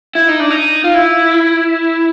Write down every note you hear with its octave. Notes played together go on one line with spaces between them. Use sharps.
E4
D#4
D4
D#4
F4
E4